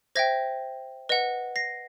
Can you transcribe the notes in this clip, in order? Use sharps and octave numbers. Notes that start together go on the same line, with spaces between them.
C5 E5 G5 G#6 A#6
B4 D#5 F#5
A#6 C7